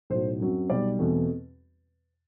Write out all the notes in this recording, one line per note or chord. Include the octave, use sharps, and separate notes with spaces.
B1 A2 F#3 C5
F#2 F#3 C4
B1 B2 G3 D5
E2 B2 A3 C4